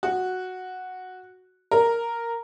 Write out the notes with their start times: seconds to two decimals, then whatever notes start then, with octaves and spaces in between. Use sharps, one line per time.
0.03 F#4
1.71 A#4